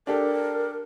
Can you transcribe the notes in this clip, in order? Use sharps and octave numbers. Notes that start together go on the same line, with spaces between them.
D4 G4 A4 A#4